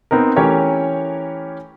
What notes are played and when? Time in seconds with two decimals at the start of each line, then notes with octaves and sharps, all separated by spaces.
0.11 B3 C4 D#4 A#4
0.36 E3 A3 C#4 G4 A#4 C#5